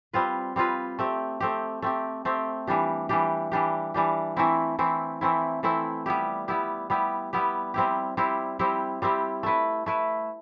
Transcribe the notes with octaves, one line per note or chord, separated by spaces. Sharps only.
G3 C4 F4 B4
G3 C4 F4 B4
A3 C4 G4
A3 C4 G4
A3 C4 G4
A3 C4 G4
E3 G3 D4 G4
E3 G3 D4 G4
E3 G3 D4 G4
E3 G3 D4 G4
E3 A3 C4 E4
E3 A3 C4 E4
E3 A3 C4 E4
E3 A3 C4 E4
G3 B3 E4 G4
G3 B3 E4 G4
G3 B3 E4 G4
G3 B3 E4 G4
G3 C4 E4 G4
G3 C4 E4 G4
G3 C4 E4 G4
G3 C4 E4 G4
A3 E4 B4
A3 E4 B4